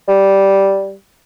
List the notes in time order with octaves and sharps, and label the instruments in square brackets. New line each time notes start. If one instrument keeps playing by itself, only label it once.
[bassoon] G3